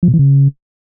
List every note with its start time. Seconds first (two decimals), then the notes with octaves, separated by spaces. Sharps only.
0.03 F3
0.08 B2
0.14 E3
0.19 C#3